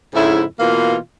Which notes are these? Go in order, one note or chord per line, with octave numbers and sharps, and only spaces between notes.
F2 G#2 C#3 E4
B2 E3 A#3 F4 F5